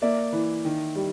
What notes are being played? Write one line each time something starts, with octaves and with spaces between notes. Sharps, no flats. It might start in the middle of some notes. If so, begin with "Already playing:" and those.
A#3 D5 E5
E3
D#3
G3